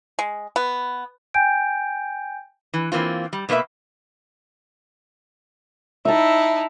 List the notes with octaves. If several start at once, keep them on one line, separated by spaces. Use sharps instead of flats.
G#3
B3
G5 G#5 G6 D7
E3
E3 A#3 C4 F4
G3
B2 A#3 B4 C#5 E5
D#4 E4 E5 A5